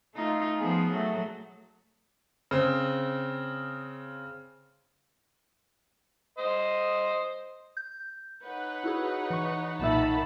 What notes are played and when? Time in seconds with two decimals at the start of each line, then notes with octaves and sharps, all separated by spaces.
0.14 A3 D#4 F4
0.57 F3 B3 G#4
0.92 F#3 A3
2.51 C#3 C4
6.38 C5 D#5
7.77 G6
8.44 D#4 B4 C#5 F#5
8.84 E4 F#4 G#4
9.30 E3 C#6
9.79 B1 A#2 D#3 E5 A5 B5